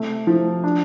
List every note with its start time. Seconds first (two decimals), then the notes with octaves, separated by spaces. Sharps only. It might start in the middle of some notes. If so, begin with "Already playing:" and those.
Already playing: C3 A3
0.27 F3
0.64 D4